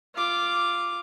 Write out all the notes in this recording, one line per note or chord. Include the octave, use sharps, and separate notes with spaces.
F4 D6